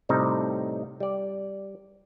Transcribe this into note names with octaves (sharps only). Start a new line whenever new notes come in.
A2 C3 G3 C4 D#4
G3 D5